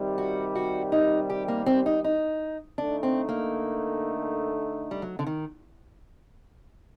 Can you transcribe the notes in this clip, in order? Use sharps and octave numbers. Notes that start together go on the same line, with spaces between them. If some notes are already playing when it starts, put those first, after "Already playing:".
Already playing: C3 D#3 G3
F#4
F#4
D#4
G4
A#3
C4
D#4
D#4
D3 A3 D4 D#4
C4
A#3
G3
F#3
D3
D#3